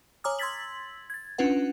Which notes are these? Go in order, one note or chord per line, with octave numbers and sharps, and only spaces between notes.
C#5 G#5 A#5 D6 D#6 F6
C6 E6 G#6 A6 B6 F#7
G#6 A6
C#4 D4 F4 B4 F#5